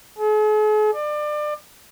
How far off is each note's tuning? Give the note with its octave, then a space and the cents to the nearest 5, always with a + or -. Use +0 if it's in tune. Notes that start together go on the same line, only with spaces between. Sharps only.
G#4 +45
D5 +30